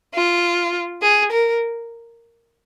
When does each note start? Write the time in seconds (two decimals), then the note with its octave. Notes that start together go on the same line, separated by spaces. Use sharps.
0.15 F4
1.02 G#4
1.32 A#4